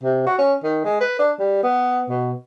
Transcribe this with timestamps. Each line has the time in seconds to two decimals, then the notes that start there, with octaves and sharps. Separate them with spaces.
0.03 C3
0.26 F#4
0.38 C#4
0.63 D#3
0.85 G#3
1.00 B4
1.19 D4
1.39 G3
1.63 B3
2.09 B2